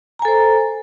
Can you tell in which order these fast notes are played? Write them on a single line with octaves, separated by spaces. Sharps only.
A#5 G#5 A4 C5